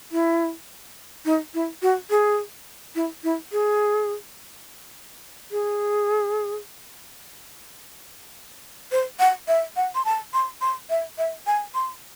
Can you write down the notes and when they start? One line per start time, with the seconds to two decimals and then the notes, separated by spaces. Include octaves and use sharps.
0.12 E4
1.25 D#4
1.54 E4
1.82 F#4
2.10 G#4
2.95 E4
3.24 E4
3.52 G#4
5.51 G#4
8.92 C5
9.19 F#5
9.48 E5
9.76 F#5
9.95 C6
10.05 A5
10.34 C6
10.61 C6
10.90 E5
11.18 E5
11.47 G#5
11.74 C6